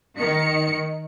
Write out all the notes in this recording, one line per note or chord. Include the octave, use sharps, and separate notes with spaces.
D#3 C#7